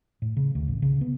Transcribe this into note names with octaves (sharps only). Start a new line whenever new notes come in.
A2
C#3
D2
A1
C#3
B3